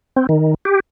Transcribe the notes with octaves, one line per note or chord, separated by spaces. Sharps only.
C4
D#3
G4